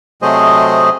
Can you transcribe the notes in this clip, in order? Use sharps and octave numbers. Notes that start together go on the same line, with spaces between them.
C3 F#3 A3 G#4 C5 D#5